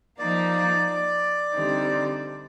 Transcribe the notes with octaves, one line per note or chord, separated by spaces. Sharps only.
F3 A#3 D#4 D5
D3 G3 C4 D#4